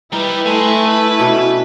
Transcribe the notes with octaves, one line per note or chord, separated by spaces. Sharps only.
G3 D#4 E4 B4
A3 G#5 C6
E4 B4
B2 C#4 D4